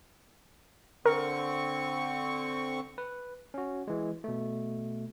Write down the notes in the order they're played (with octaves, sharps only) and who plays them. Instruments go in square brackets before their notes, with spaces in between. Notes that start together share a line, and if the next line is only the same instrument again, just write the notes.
[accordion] D3 C4 C#6 [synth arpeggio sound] A#4
[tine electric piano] B4
C#4 F#4
E3 G#3
B2 A3